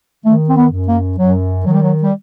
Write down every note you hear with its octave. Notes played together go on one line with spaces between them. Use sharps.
D#3 A3
C4
B3
F#2
A#3
F#2 F#3
D#3 F#3
G3
F#3
G3